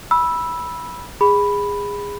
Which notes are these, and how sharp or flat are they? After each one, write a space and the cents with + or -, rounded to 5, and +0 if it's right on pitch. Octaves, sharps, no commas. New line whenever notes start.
B5 -15 E6 +0
G#4 -20 B5 +0